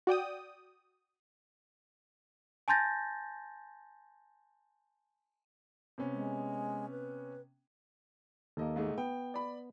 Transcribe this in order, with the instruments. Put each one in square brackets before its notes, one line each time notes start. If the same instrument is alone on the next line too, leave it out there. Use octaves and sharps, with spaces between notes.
[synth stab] F#4 D5 G5 D#6
[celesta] G#5 A5 C6 G6 A6 A#6
[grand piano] C3 B3 C#4
[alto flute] G#3
B4
[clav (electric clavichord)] D#2 A#3 [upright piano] A4 D#5
[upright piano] G#2 A3 D#4
[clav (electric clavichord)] B3 [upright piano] G5
[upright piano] D5 B5